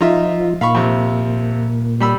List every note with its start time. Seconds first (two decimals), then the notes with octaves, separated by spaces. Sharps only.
0.01 F3 D#4 F4 E5
0.61 A#2 F5 B5 C#6
0.75 F2 C3
2.00 G3 B5 E6